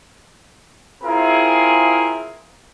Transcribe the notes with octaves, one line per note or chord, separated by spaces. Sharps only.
C4 E4 F4 G#4 A#4